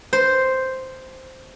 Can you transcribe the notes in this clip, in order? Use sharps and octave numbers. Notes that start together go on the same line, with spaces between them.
C5